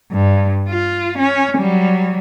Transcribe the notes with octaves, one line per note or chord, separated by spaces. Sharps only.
G2
F4
C#4
F#3 G3